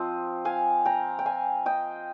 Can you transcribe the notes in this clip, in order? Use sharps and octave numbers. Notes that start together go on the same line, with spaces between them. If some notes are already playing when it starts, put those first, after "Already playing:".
Already playing: F3 C4 F4 D#5
F5 G#5
G5 A#5
G5
F5 G#5
D#5 G5